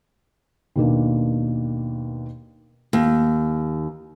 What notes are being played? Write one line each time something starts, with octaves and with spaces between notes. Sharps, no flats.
D#2 B2 A#3 D4
D#2